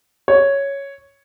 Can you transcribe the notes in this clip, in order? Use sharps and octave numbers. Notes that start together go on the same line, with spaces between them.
C#5